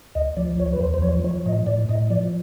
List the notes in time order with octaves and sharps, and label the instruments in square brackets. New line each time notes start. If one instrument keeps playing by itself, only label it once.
[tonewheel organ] D2 D#5
F3 D5
D2 C#5
B4
E2 C5
C5
F3 C#5
F3 C#5
A2 D#5
A2 D5
A2 D#5
F3 D5